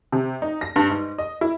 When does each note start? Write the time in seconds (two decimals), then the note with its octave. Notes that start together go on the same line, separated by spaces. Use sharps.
0.12 C3
0.42 D#4
0.61 A#6
0.76 G2
0.90 G#2
1.18 D#5
1.41 E4